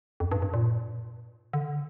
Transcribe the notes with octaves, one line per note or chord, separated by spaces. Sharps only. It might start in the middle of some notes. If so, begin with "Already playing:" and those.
F2
G2
G2
A#2
D3